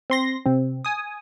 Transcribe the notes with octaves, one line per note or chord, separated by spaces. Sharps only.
C4 C6 A#6
C3 C4
G#5 D#6